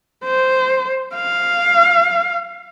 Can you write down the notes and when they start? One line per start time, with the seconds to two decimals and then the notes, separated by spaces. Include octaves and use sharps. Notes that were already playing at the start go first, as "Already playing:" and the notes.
0.25 C5
1.15 F5